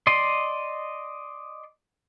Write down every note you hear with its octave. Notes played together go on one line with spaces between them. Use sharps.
D5 D#5 C6